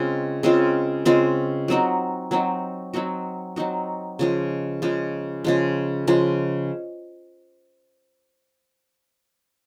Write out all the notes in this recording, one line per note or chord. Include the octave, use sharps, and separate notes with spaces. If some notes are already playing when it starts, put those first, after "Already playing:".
Already playing: C#3 G#3 C4 F4
C#3 G#3 C4 F4
C#3 G#3 C4 F4
F#3 C4 D#4 F#4
F#3 C4 D#4 F#4
F#3 C4 D#4 F#4
F#3 C4 D#4 F#4
C#3 F3 G#3
C#3 F3 G#3
C#3 F3 G#3
C#3 F3 G#3